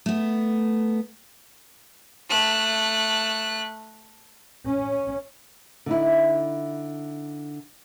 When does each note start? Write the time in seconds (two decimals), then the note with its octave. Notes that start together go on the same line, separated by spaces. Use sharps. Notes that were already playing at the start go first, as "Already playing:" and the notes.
0.06 A3 B3
2.29 A3 F#6
4.66 C#4
5.86 D3 D#4 E4